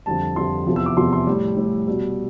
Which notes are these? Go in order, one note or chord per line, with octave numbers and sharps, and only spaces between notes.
F2 D3 G3 A5
F2 D3 G3 C6
E2 C3 F3
E6
D6
E2 C3 F3 C6
C6
A2 G3
A2 G3
B2 G3